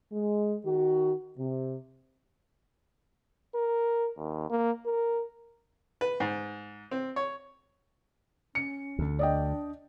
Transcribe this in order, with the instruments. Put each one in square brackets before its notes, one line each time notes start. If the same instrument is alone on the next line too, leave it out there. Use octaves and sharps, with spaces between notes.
[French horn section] G#3
D#3 F#4
C3
[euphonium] A#4
D#2
A#3
A#4
[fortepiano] B4
G#2
C4
C#5
[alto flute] C#4 [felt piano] C#7
[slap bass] D2 D3
[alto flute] D4 [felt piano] D5 D#5 G5